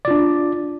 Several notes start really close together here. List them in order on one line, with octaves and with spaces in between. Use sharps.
D5 F4 D4